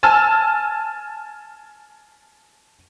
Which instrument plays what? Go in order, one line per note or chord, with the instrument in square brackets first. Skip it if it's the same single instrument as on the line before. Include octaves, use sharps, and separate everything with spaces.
[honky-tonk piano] G#5 A5 E6 F6